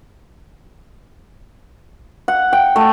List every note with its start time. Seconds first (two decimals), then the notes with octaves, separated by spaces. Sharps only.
2.28 F#5
2.53 G5
2.76 A3